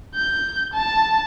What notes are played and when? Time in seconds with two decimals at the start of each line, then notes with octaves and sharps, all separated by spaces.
0.15 G6
0.73 A5